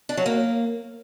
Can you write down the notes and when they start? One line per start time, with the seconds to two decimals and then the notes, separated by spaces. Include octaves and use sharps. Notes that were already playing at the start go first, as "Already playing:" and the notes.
0.09 D4
0.17 F#3
0.26 A#3